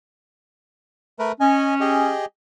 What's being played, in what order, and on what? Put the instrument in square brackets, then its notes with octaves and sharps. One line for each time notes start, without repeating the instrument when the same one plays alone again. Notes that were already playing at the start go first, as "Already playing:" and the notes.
[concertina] A3 A#4 B4
[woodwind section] C#4 [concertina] D#5 G#5
[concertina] G4 G#4 D#5